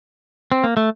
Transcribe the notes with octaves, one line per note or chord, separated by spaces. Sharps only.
C4
A#3
A3